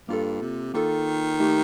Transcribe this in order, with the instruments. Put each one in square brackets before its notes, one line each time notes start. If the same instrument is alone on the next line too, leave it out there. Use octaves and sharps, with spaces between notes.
[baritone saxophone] G2 [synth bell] A#3 F4 A4
[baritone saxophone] C3
[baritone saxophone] D#3 [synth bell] A#3 F4 A4
[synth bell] A3 D#4 G4